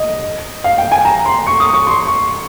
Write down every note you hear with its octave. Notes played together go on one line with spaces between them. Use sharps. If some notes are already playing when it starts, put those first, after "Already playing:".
Already playing: D#5
F5
G5
G#5
A#5
C6
C#6
D#6
C#6
C6
C#6